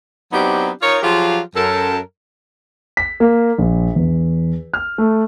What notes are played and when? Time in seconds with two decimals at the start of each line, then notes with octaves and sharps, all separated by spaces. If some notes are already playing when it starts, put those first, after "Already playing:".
0.33 F#3 B3 C4 D4 D#4 G4
0.82 D#4 F4 A#4 C#5
1.03 F3 F#3 F4 G4 G#4
1.55 F#2 A4 A#4
2.97 B6
3.20 A#3
3.58 A#1
3.96 E2
4.74 F6
4.98 A3